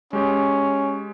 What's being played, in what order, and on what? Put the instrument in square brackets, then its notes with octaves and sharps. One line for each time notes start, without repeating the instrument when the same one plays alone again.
[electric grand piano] G#3 G4 [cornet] C#4